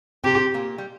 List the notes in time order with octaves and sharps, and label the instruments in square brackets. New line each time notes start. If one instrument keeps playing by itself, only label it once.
[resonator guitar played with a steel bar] C3 C4 [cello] G4
[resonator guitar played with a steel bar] A#2 A#3
G3